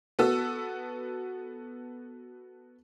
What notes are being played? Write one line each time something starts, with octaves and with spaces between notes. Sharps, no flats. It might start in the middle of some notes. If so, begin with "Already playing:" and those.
B3 F#4 A4 E6